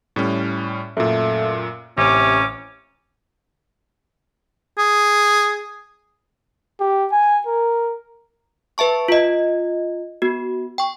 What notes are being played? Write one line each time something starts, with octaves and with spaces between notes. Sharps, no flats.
A2 G3 C#4
F#2 A#2 A3
A1 C3 C#4 D6
G#4
G4
G#5
A#4
B4 E5 A5 C#6
F4 D#5
B3 F#4
G5 C#6